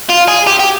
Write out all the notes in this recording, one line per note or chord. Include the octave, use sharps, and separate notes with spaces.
F4
G#4
G4
G4